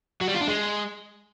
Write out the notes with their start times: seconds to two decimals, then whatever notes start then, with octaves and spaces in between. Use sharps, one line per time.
0.21 F#3
0.28 G3
0.35 F4
0.41 D4
0.48 G#3